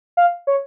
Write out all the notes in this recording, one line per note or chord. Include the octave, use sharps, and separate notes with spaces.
F5
C#5